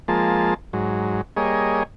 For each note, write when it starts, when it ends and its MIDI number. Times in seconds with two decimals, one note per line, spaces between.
0.08 0.54 53
0.08 0.54 56
0.08 0.54 58
0.08 0.54 81
0.73 1.21 44
0.73 1.21 54
1.37 1.83 55
1.37 1.83 58
1.37 1.83 68
1.37 1.83 73
1.37 1.83 75